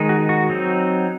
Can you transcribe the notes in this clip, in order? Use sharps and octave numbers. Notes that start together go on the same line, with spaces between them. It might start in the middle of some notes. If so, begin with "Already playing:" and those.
Already playing: D#3 G#3 D#4
F#4
F#4
F#3 C4 D#4